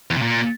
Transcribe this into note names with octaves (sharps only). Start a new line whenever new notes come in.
E2
C3
A#2